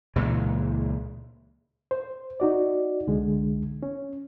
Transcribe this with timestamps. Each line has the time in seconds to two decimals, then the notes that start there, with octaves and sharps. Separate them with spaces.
0.16 C#2 A#2 E3 G#3
1.91 C5
2.40 D#4 F#4 D5
3.07 C2 D3 G#3
3.83 C#4